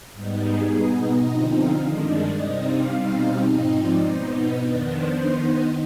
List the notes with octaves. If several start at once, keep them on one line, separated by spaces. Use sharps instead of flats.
G#2 G3 B3 D#4
G#4
B2 B3 D#4
D#5
D3 F3 C4 D#4
F5
G2 D#3 G#3 D4 D#5
D5
C3 G3 C4 D#4 D#5
F5
B2 G3 C4 D#4
G#2 F3 C4 D#4 D#5
D5
B2 B3 D#4 C5
B4
F2 D#3 B3 D4
C5
D#3 B3 D#4